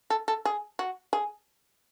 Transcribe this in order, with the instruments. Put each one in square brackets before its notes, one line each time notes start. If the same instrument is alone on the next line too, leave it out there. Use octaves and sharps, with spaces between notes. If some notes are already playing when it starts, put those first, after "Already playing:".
[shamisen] A4
A4
G#4
F#4
G#4